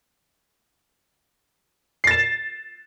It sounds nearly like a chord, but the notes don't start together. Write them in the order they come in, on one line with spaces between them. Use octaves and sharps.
C7 A6 E7